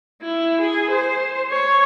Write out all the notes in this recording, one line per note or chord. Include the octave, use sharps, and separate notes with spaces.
E4
G#4
C5
C#5